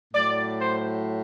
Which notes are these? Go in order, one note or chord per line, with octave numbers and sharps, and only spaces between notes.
A2 F#3 D5
C5